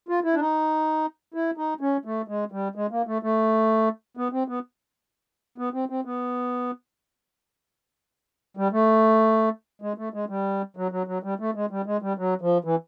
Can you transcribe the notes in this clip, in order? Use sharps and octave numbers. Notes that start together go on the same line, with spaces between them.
F4
E4
D4
D#4
E4
D#4
C#4
A3
G#3
G3
G#3
A#3
A3
A3
B3
C4
B3
B3
C4
C4
B3
G3
A3
G#3
A3
G#3
G3
F#3
F#3
F#3
G3
A3
G#3
G3
G#3
G3
F#3
F3
E3